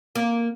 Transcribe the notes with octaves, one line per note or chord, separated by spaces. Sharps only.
A#3